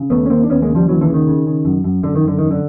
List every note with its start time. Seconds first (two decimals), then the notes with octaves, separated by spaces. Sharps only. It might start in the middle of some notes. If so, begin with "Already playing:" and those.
Already playing: C#3
0.10 D#2 A3 B3
0.26 C#4
0.30 D#2 A#3 C4
0.43 D4
0.49 D#2 B3 C#4
0.62 G#3 A#3
0.69 C#3
0.75 F3 G3
0.88 D#2 E3 F#3
1.01 D3 E3
1.07 C#3
1.13 D#3
1.27 C#3
1.46 C#3
1.65 F#2
1.84 F#2
2.03 F#2 D3
2.15 D#3
2.23 F#2 D3
2.38 F#2 D#3
2.51 D3